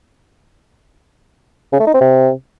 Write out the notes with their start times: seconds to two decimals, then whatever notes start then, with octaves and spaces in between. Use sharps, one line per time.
1.73 C#3
1.80 A3
1.87 D#4
1.94 C4
2.01 C3